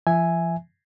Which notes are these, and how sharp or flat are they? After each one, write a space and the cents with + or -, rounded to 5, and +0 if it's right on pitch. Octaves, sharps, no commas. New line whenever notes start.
F3 -40 E5 +0 G#5 +0